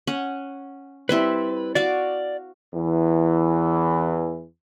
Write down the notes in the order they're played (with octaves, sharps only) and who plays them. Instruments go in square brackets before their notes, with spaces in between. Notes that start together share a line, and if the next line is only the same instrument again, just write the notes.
[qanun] C#4 F#5
[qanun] G3 C4 E4 [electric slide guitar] B4
[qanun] F#4 F5 D6 [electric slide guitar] D5
[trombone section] E2 E3